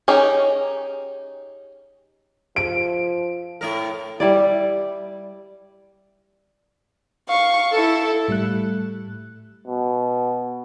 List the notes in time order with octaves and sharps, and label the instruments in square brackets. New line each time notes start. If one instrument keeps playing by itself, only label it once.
[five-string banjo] C#4 D#4 G4 G#4
[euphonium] F3 [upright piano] D7
[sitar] A2 A#4
[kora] G3 E4 D5
[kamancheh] F5 C#6
E4 A4
[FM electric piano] A2 G3 A3 F#6
[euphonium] B2